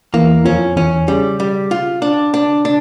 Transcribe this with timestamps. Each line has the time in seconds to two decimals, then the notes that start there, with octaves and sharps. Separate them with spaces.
0.14 E2 E3 A#3
0.45 F2 F3 C#4
0.76 E2 E3 C#4
1.08 C#3 G3
1.40 G3
1.71 F4
2.02 D4
2.34 D4
2.65 D4